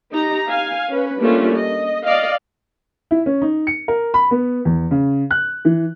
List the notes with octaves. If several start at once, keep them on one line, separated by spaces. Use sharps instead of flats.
D#4 G4 A#5
F5 G#5
C#4 B4
G3 A3 A#3 C#4 D4 F4
D#5
D5 D#5 F5
E4
C#4
D#4
C#7
A#4
B5
B3
E2
C#3
F#6
E3